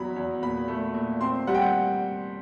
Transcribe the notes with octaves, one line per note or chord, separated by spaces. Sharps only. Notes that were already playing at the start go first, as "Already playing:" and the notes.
Already playing: E2 F#3 A#5 B5
E2
A#2 B5
A3
A#2
C4 C6
G3 F#5
G5
F#5